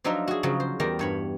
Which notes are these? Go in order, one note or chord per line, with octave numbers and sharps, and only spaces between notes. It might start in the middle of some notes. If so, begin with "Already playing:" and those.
F3 F#3 D4 D#4 F4 E5
F#4 G#4
C#3 F3 F#3
C5
E2 G3 A#4 G5 A5 A#5
G2 C#5 B5